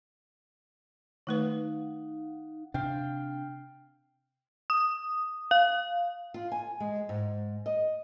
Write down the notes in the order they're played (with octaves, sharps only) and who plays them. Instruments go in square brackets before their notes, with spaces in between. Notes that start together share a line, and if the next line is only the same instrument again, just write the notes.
[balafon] D#3 A3 B4 [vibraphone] D#4 F5 F#5
[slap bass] C3 D4 [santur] F5 G5
[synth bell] D#6
F5
[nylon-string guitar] F4
G#5
G#3
G#2
D#5